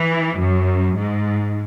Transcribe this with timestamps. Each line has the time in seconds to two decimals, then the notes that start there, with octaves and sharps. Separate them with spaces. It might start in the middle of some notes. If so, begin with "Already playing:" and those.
Already playing: E3
0.38 F#2
0.97 G#2